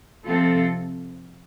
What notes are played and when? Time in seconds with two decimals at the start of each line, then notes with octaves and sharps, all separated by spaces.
0.26 C3 F3 C4 F4 A4